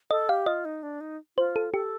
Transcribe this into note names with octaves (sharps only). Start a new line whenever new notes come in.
A4 D#5
G4 F5
F4 D#5
D#4
D4
D#4
F4 C5
A4
G4 A4